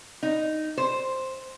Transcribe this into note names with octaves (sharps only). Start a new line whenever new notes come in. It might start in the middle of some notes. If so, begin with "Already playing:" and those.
D#4
C5